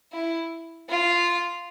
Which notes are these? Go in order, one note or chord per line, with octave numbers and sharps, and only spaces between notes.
E4
F4